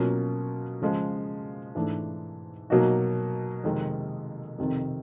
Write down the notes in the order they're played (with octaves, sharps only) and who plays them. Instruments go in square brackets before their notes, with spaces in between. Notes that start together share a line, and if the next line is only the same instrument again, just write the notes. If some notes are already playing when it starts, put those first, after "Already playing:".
Already playing: [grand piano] B2 F#3 A#3 C#4 F4
C#3 F3 G#3
G#2 E3 A3 D4
B2 F#3 A#3 D#4 F#4
F2 C3 D#3 G#3
F2 C3 D#3